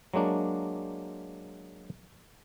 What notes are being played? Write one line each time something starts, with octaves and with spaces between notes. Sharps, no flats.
F#3 G#3 A#3 D4